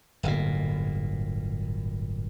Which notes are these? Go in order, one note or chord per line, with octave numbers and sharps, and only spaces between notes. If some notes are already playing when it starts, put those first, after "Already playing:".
D1 G1 A#2